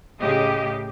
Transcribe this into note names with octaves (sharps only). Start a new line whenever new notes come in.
A2 C#3 G4 D#5